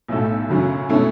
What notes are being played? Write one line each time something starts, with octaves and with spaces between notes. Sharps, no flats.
B1 A2 A3 F#4 A4
F#2 C#3 F#3 C#4
B2 A3 C#4 E4 A4